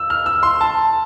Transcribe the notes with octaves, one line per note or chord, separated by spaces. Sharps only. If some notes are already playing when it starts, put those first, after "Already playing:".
Already playing: E6
F6
E6
C6
A5